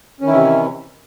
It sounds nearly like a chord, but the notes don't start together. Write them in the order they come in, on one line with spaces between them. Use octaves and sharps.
C#4 D#3 E4 E3 C3